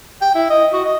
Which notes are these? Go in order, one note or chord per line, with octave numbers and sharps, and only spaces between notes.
G5
E4
D#5
F#4
D#5